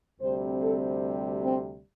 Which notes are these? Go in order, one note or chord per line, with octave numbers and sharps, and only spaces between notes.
D2 C3 G3 C4 C5
A4
C4